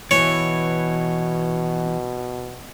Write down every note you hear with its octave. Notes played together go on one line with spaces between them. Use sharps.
B2 E3 C#5